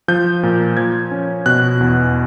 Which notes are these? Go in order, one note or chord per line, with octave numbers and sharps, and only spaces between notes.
F3 G6
A#2
F3 G#6
C#4
B2 F#6
E2